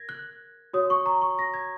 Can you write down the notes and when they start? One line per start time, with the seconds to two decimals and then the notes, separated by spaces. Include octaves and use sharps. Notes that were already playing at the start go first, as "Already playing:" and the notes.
Already playing: A#4 G#6 A#6
0.09 F#6
0.74 F#4 C#5 D#6
0.90 C#6
1.06 A#5
1.22 C#6
1.39 A#6
1.54 G#6